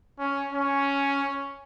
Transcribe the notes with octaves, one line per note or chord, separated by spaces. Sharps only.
C#4
C#4